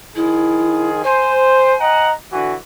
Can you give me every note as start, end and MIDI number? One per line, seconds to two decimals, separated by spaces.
0.15 1.00 51
0.15 1.00 53
0.15 0.89 64
0.15 1.00 68
1.04 1.74 72
1.04 2.06 80
1.80 2.11 75
1.80 2.11 78
1.80 2.11 82
2.32 2.55 50
2.32 2.55 52
2.32 2.55 66
2.32 2.52 80